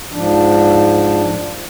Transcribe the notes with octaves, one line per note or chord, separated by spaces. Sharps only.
G#2 F3 D4